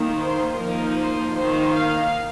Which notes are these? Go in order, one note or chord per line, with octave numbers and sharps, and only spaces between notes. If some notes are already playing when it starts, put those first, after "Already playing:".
Already playing: D#3 A#3 D#4
C5
F3 A#3 D#4 A#4
C5
D#3 A#3 D#4 C5
F5